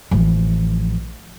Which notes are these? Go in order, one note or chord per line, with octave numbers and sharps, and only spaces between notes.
A1 F3